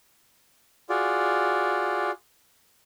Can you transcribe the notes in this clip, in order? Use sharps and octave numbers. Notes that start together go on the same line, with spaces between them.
F4 F#4 G#4 D5